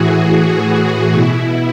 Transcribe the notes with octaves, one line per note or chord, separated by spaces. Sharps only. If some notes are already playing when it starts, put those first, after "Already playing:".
Already playing: A2 E3 F#4 G#4
B2 E4